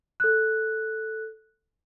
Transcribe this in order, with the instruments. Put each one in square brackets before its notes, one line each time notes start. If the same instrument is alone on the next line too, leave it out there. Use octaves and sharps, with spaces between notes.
[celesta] A4 F#6